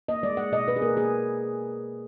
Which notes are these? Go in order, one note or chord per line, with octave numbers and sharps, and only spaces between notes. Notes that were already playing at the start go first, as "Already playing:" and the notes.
A#3 D#5
G#3 D5
G#3 F#5
B2 D#5
B2 B4
G#4
A#3 A#4
A#3 G#4